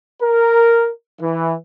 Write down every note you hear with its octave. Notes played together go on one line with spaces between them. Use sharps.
A#4
E3